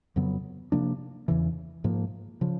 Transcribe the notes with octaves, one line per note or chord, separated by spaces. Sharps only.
F2 C#3 F#3 B3
C3 F3 A#3 D4
E2 C#3 E3
G#2 F3 A#3
C#3 F3